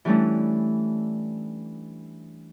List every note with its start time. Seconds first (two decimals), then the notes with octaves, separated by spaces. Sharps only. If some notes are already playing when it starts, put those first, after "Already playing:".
0.05 E3 G3 A3 C#4 D4 E4